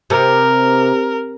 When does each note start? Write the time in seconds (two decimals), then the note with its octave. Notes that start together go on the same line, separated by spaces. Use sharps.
0.10 C3 A#4